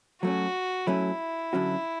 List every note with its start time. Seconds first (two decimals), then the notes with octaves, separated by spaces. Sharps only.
0.23 F#3 A3 C#4 F#4
0.87 F#3 A3 C#4 E4
1.53 D3 F#3 C#4 F#4